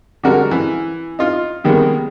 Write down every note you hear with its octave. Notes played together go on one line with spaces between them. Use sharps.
D3 G3 G#3 F#4 A#4
E3
D#4 F4
C3 D#3 G3 G#3 A#3 B3